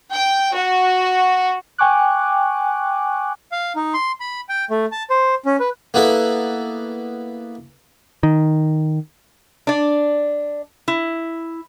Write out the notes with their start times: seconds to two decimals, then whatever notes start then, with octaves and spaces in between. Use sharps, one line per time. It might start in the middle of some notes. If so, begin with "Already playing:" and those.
0.12 G5
0.54 F#4
1.78 G5 G#5 C#6 D6 F#6
3.52 F5
3.76 D#4
3.94 C6
4.20 B5
4.49 G5
4.70 A3
4.92 A5
5.10 C5
5.45 C#4
5.60 B4
5.94 A#3 B3 E4 A4
8.23 D#3
9.67 D4 D5
10.88 E4